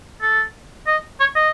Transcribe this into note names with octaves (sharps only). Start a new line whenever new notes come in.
A4
D#5
C#5
D#5